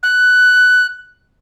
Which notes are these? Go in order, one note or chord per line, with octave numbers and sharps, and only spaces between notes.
F#6